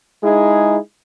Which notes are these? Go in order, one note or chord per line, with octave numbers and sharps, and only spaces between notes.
G#3 D#4 E4 G#4